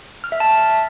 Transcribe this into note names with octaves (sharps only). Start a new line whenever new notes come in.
F6
E5
A5